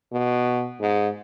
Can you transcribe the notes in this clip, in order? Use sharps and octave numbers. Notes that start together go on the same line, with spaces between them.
B2
G#2